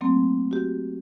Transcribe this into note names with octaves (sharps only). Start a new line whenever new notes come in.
F#3 A3 A#3 C4
F#4 G4